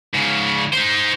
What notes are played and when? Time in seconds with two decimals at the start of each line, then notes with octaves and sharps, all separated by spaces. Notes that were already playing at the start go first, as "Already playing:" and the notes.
0.14 G#2 C#3
0.73 D#4 C5